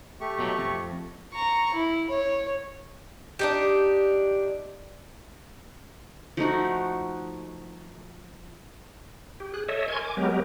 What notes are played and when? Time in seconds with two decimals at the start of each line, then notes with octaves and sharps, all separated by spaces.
0.21 A3 G4 C#6
0.39 B2 F#3
0.58 F2
1.33 A#5 C#6
1.74 E4
2.10 C#5
3.39 D4 D#4 G4
6.37 F3 A3 D#4 F#4
9.40 G4
9.54 G#4 F#6
9.69 A4 C#5 D#5 E5
9.88 A#4 G#5 C6 C#6 G#6
10.01 G#5 D6
10.17 F#3 G#3 B3 G4 A#4